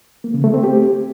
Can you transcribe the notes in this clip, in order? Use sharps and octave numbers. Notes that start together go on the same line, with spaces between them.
A#3
C#3
A3
C4
G4